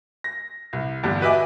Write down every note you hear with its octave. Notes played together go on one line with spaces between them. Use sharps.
A#6
C2
E2 G2 D3 G3
F#4 B4 D#5 E5 G#5 D6